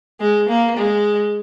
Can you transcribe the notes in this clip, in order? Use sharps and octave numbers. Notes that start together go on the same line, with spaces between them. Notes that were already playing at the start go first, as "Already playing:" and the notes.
G#3
A#3
G#3